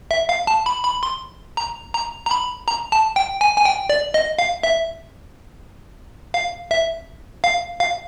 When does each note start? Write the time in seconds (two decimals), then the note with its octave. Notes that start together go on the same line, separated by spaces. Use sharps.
0.11 E5
0.29 F5
0.47 A5
0.66 B5
0.84 B5
1.03 C6
1.57 A#5
1.94 A#5
2.26 A#5
2.31 B5
2.68 A#5
2.92 A5
3.16 G5
3.41 G#5
3.57 G#5
3.65 G5
3.89 D5
4.14 D#5
4.39 F5
4.63 E5
6.34 F5
6.71 E5
7.44 F5
7.80 F5